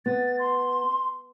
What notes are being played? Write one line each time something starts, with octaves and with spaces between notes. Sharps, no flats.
B3 A6
C6